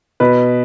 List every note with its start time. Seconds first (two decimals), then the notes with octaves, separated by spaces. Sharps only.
0.20 B2 B4